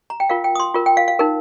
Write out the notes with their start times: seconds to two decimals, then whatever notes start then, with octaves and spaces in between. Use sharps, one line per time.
0.10 A#5
0.20 G5
0.30 F4 A#4 F5
0.44 G5
0.55 D#6
0.60 C6
0.74 F4 A#4
0.86 G5
0.97 F5
1.08 F5
1.19 D#4 A#4